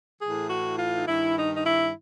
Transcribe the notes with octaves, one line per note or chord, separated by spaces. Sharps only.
A2 E3 G#4
F#4
F4
D#4
G2 D#3 E4
D#4
D#4
E4